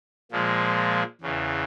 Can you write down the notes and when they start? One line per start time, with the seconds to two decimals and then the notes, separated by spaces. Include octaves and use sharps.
0.32 A#2 F3 G#3
1.21 E2 C#3 E3